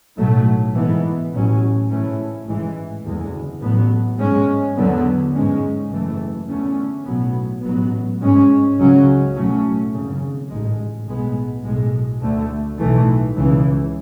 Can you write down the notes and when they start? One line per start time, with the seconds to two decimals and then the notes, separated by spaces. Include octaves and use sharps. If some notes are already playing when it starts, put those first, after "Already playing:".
0.17 B1 A2 F#3 A3
0.74 G#2 E3 B3
1.33 A1 A2 F#3 C#4
1.89 G#2 E3 A3 C#4
2.47 A1 G#2 E3 G#3
3.04 F#1 E2 D3 G#3
3.61 A1 A2 F#3 B3
4.18 G#2 G#3 C#4
4.75 E2 D3 F#3 B3
5.33 G#2 G#3 C#4
5.90 F#1 F#2 E3 A3
6.48 E2 D3 A3 C#4
7.05 B1 A2 F#3 B3
7.62 A1 G#2 F#3 B3
8.20 G#2 G#3 C#4
8.77 C#2 C#3 F#3 C#4
9.34 B1 A2 F#3 A3 C#4
9.92 G#1 F#2 C#3
10.48 A1 G#2 G#3
11.05 B1 A2 G#3 B3
11.63 B1 A2 G#3
12.21 D2 D3 A3
12.79 B1 A2 E3 A3
13.36 C#2 C#3 E3